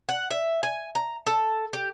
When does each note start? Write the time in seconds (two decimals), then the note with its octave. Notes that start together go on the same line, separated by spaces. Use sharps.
0.09 F#5
0.31 E5
0.63 G#5
0.95 A#5
1.27 A4
1.73 G4